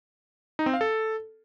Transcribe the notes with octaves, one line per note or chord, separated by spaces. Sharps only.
D#4
C4
F5
A4